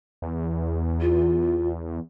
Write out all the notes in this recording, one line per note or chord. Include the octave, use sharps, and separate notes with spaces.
E2
F4